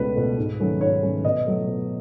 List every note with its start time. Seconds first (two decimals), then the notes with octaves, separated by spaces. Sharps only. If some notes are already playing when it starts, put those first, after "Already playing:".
Already playing: C#2 B2 A3 B4
0.16 B2 A3
0.38 G#2
0.60 D#3 F#3 A3 C#4
0.80 G#2 C#5
1.02 D#3 F#3 A3 C#4
1.25 B2 D#5
1.46 F#3 A3
1.67 B2